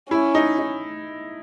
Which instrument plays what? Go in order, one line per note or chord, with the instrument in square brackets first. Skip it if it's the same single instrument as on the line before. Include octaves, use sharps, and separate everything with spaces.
[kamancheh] C#4 [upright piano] E4
[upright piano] D#4
D#4